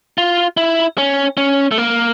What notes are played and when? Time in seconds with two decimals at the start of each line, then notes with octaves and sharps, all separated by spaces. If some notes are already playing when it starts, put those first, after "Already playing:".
0.18 F4
0.57 E4
0.98 C#4
1.37 C#4
1.71 A3
1.78 A#3